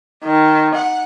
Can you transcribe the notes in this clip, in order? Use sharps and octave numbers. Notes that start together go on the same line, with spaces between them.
D#3
F#5